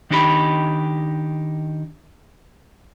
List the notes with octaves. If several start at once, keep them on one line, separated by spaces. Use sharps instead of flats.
D#3 D4 D#4 G4 C5 B5